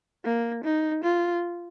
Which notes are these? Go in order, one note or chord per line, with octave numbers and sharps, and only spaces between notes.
A#3
D#4
F4